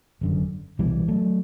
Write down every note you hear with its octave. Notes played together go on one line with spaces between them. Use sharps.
G1 F#2 D3
C2 B2 E3 G3
F#3 A3